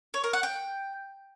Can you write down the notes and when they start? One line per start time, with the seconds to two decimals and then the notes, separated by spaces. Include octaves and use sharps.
0.14 C#5
0.24 A#4
0.33 F#5
0.43 G5